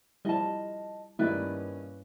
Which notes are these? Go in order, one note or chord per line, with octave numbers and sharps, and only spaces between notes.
F3 G3 E4 D#5 A5
G2 D#3 G3 A#3 C#4 E4 B4 D5